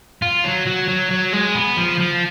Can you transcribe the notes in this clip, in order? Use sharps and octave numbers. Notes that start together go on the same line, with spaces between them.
F4
F#3
F#3
F#3
F#3
G#3
B3
F3
F3